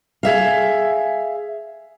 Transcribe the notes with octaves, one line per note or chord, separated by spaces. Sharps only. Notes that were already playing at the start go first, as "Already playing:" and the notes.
G#4 E5 F5